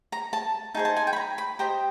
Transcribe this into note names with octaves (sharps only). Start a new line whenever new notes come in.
A#5
A5
D#4 G#4 C5 A5
A5
G#5
G5
B5
A#5
B5
G4 C5 D#5 A#5